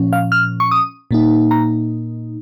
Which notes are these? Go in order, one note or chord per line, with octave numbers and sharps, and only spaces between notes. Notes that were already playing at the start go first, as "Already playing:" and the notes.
Already playing: A#2 F3 C#4
F5
F6
C#6
D#6
A#2 A#3 D#4
A#5